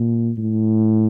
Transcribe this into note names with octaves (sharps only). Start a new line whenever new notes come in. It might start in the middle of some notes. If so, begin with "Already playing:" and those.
Already playing: A#2
A2